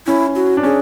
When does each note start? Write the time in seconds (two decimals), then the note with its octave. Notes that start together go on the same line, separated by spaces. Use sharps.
0.06 C#4 E4
0.35 F#4
0.57 D4
0.63 C#4 G#4